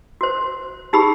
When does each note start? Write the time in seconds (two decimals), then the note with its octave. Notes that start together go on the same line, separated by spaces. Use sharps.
0.21 F#4 C5
0.93 D#4 G4 G#4 B5